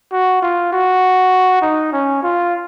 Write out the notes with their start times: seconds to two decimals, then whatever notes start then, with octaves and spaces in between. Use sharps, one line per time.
0.12 F#4
0.42 F4
0.73 F#4
1.62 D#4
1.93 C#4
2.23 F4